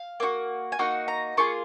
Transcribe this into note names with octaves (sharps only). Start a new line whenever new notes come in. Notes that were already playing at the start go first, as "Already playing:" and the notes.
Already playing: F5
A#3 D#4 F#4
G#5
A#3 D#4 F#4 F#5
A#5
A#3 F4 G#4 C#6